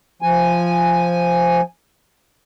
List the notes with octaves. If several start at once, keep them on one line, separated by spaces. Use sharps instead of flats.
F3 G#5